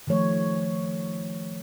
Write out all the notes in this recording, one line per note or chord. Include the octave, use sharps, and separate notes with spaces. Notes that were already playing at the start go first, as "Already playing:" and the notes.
D#3 F3 A3 C#5